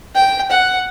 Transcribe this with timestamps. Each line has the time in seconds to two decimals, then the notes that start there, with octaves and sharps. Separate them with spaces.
0.15 G5
0.51 F#5